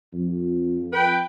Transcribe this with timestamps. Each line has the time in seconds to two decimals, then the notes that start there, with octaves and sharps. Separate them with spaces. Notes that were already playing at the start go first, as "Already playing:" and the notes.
0.13 F2
0.93 B4 G5